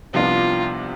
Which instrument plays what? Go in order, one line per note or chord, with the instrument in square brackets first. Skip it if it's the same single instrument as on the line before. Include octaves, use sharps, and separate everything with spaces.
[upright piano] C2 C3 F3 B3 D4 [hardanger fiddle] F4